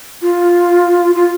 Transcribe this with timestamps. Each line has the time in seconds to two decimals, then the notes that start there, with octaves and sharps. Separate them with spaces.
0.22 F4
1.15 F4